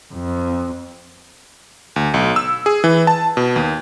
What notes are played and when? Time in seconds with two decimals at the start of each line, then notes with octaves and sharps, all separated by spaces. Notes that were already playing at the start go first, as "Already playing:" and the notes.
0.14 F2
1.96 D2
2.14 B1
2.36 E6
2.66 G#4
2.84 E3
3.07 A5
3.37 B2
3.56 D#2